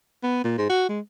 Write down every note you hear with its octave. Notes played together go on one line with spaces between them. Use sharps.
B3
A#2
G#2
F#4
G#3